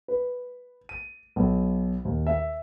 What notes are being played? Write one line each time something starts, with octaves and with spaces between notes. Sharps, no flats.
B4
D#7
B1
D#2
E5